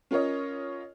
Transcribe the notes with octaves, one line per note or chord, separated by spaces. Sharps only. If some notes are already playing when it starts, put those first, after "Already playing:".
C#4 F4 A#4 C#5 D#5